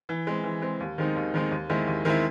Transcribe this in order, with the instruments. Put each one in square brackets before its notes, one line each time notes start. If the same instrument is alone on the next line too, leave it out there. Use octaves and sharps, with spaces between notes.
[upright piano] E3
G#3 C4
E3
G#3 C4
D#2
D#3 G#3 C4 D#4
D#2
D#3 G#3 C4 D#4
D#2
D#3 G#3 C4 E4
D#2
D#3 G#3 C4 E4